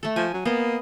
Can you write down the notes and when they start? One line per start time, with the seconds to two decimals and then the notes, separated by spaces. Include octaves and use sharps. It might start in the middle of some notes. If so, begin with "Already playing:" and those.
0.03 A3 A4
0.16 F3 G#5
0.33 F#3
0.45 A#3 B3 D#5